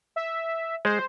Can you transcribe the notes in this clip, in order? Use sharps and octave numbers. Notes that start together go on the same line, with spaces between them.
E5
G#3 C5